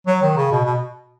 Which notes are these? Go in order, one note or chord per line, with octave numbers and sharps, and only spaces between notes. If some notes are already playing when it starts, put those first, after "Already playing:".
F#3
D#3
C#3
B2
B2